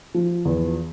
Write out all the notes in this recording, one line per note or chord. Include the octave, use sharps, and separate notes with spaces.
F3
E2